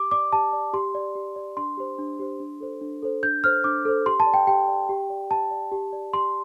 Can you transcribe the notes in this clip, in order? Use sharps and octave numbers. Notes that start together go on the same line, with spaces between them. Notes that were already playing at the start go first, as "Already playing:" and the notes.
Already playing: G4 D6
D5 D6
G4 A5
D5
G4 C6
D5
G4
D5
D4 C6
G4 C5
D4
G4 C5
D4
A4 C5
D4
A4 C5
D4 G6
A4 C5 F6
D4 D6
A4 C5
G4 C6
A5
D5
G5
G4 G5
D5
G4
D5
G4 A5
D5
G4
D5
G4 C6